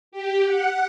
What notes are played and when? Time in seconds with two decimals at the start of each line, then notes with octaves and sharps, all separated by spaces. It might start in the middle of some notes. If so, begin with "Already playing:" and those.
0.12 G4
0.45 F#5